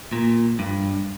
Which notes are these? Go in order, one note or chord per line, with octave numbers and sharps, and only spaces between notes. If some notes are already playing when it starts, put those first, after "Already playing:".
A#2
G2